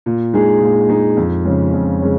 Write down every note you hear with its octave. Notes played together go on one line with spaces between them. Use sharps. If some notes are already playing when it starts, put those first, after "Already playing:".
A#2
G#3 D#4 G#4
A#2
G#3 D#4 G#4
F2
C#3 F3 G#3 C#4
F2
C#3 G#3 C#4